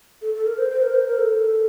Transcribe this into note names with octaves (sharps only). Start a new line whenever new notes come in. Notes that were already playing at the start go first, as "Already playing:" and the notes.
A4
A4
A#4
C5
C5
A#4
C5
A#4
A4